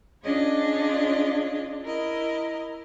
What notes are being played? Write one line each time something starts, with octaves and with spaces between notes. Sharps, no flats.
C#4 D4 F4 G#4 C#5 D#5
E4 A#4 D#5